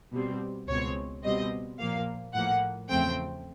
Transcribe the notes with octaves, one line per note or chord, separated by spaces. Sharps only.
B2 G3 C4
C#2 B2 G#3 C4 C#5
B2 G3 C4 D#5
A#2 F3 A#3 F5
A2 F3 A#3 F#5
E2 C#3 F3 A3 C4 G5